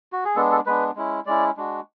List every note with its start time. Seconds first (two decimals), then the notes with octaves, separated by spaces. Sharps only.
0.13 F#4
0.25 G#4
0.36 G#3 B3 D4 A4
0.51 A4
0.66 G#3 B3 D4 B4
0.96 G#3 C#4 E4
1.26 G#3 C#4 E4 D5
1.57 G#3 D4 F#4